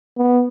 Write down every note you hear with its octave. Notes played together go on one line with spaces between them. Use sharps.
B3